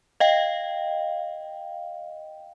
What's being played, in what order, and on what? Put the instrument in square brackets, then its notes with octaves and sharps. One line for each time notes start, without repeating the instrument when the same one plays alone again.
[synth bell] D#5 F5 G5